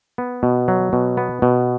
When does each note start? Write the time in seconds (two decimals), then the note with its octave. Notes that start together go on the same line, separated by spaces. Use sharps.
0.18 B3
0.43 B2
0.68 F#3
0.93 B2
1.17 B3
1.42 B2